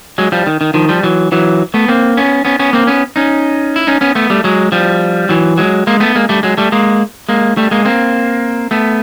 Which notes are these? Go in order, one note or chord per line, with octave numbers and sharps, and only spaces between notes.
F#3 G#3
F3 G3
D#3
D#3
D#3 F3
F3 G3
E3 F#3
E3 F#3
A3 B3
A#3 C4
B3 C#4
B3 C#4
B3 C#4
A#3 C4
B3 C#4
C#4 D#4
E4
C#4 D#4
B3 C#4
A3 B3
G3 A3
F#3 G#3
F3 G3
E3 F#3
F#3 G#3
G#3 A#3
A3 B3
G#3 A#3
G3 A3
F#3 G#3
G3 A3
G#3 A#3
G#3 A#3
G3 A3
G#3 A#3
A#3 C4
A3 B3